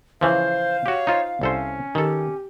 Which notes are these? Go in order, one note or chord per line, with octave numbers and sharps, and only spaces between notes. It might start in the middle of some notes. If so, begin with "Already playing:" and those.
C#3 E3 F3 C5 F5
F#4 G4 C#5
D#4 F4 C5
C2 C#4 A4 C5
D#3 G4 A4